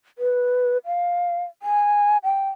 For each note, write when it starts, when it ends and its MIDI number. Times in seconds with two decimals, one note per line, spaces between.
0.18 0.78 71
0.86 1.44 77
1.62 2.17 80
2.24 2.49 79